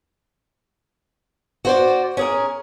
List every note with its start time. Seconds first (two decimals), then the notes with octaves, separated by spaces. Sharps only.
1.65 F#4 C5 D5
2.17 C#4 G#4 A#4